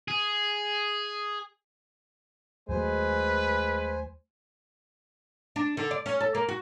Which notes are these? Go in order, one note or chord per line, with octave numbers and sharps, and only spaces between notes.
G#4
D#2 F#3 G#3 A3 B4 C5 G#5
D4
D3
D5
C#4
A4
A#3
F#4